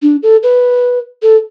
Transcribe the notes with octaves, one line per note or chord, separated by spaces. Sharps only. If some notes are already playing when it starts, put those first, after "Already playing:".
D4
A4
B4
A4